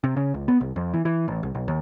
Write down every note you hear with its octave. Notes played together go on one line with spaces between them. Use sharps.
C3
C#3
C#2
B3
C2
F2
E3
E3
A1
C2
B1
D#2